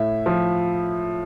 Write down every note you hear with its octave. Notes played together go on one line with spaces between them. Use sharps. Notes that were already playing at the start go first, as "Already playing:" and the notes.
Already playing: A2 E5
F3